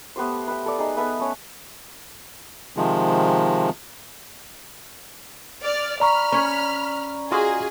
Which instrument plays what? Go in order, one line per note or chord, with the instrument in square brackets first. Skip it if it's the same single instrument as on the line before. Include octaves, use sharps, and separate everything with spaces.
[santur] A3 B3 G4 C5
B4 G5
A4 D5
D#4 G#4
B3 A4 B4 E5
A3 C#4 C#5
[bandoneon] C3 D#3 F3 G#3
[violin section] D5 F6
[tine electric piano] D5 A#5 C#6 [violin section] B5 F6
[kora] C#4 C#5
[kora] F4 F#4 D#5 [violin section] G#4